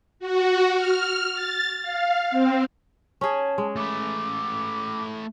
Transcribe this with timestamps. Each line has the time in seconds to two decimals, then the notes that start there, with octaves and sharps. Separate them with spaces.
0.19 F#4
0.75 F6
1.33 A6
1.82 F5
2.31 C4
3.21 C#4 G#4 A5
3.58 G#3
3.76 A3 B4 D6